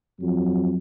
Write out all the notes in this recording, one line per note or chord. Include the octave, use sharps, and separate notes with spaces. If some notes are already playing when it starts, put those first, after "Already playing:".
F2 F#3